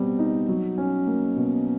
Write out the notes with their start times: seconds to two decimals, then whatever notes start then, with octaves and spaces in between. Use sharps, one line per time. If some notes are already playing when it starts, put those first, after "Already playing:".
Already playing: B2 G3 C4
0.19 D#4
0.48 F#3
0.78 C#4
1.07 A#3
1.36 B2